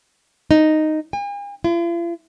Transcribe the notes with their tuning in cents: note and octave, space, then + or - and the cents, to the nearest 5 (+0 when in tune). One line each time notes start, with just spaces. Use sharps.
D#4 -5
G#5 -45
F4 -45